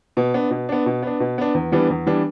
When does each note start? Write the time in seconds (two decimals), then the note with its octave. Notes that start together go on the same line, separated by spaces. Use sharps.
0.17 B2
0.34 B3 D4
0.51 B2
0.69 B3 D4
0.86 B2
1.02 B3 D4
1.20 B2
1.38 B3 D4
1.54 E2
1.72 E3 G3 B3 D4
1.90 E2
2.06 E3 G3 B3 D4